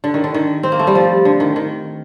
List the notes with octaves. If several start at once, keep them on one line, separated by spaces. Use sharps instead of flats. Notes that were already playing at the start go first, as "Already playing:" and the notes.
D3
D#3
D3
D#3
C4
A#3
A3
G3
F3
D3
D#3
D#3